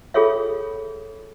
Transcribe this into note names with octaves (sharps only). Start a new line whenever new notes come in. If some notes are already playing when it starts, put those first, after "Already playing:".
F4 G#4 A4 C#5 E5